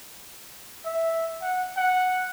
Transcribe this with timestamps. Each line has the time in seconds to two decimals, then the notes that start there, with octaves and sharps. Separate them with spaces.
0.85 E5
1.42 F#5
1.77 F#5